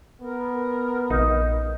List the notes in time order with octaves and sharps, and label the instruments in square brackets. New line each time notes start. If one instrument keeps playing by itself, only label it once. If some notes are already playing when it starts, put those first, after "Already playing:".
[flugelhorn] B3 [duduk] A#4
[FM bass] A#1 [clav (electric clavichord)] D#4